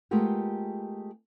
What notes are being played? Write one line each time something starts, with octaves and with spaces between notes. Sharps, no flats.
G#3 A3 B3 F4 G4 A#4